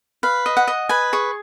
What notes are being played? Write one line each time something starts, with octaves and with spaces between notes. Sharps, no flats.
B4 F5
D#5
F#5
D#5
B4 G#5
G#4 C#6